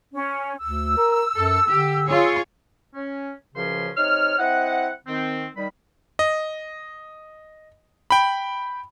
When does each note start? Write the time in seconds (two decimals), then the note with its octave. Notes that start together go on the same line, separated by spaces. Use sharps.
0.15 C#4
0.62 D2 E6
0.97 A#4
1.36 F#2 A4
1.68 D3 G4
2.08 F4 G#4 C#5
2.94 C#4
3.55 C#2 F#2 C#3 F3 C#4 C6
3.96 C3 D#4 C#5 F6
4.38 C4 E4 D#5 F#5
5.07 D#3 C4
5.57 D#3 G3 B5
6.19 D#5
8.10 G5 B5